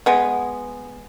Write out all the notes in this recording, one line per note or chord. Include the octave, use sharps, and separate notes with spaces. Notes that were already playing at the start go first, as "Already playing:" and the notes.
G#3 B3